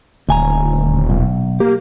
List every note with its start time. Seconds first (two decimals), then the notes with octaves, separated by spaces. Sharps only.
0.29 D#1 D2 G#5 A#5
1.10 B1
1.60 A#3 G4